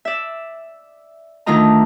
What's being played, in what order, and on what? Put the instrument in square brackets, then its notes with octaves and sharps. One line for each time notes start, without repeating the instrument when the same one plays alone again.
[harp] D5 E5
D2 D#3 A3 F4 D#5 A#5